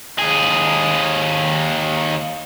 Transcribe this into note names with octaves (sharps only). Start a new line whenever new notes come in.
D#2 G#4